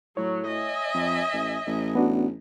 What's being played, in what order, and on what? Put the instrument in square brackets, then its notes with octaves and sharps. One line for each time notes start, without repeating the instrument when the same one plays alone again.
[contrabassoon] A2 [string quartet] F#3 [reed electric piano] C#5
[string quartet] D#5 E5 G#5
[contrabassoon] F2
A1
A1
[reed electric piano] B3 D4 F#4